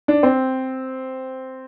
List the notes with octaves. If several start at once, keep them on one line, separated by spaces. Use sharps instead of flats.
D4
C4